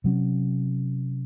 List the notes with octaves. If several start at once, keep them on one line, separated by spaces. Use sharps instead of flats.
C3 F#3 C#4